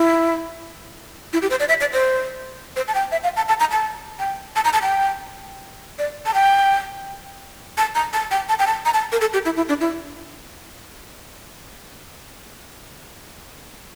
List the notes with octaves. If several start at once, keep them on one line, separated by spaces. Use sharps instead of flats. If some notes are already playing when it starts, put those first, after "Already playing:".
Already playing: E4
E4
G4
C5
D5
E5
D5
C5
C5
A5
G5
E5
F5
A5
A5
A#5
A5
G5
A5
A#5
A5
G5
D5
A5
G5
A5
A#5
A5
G5
A5
G5
A5
A#5
A5
A#4
A4
G4
E4
E4
D4
E4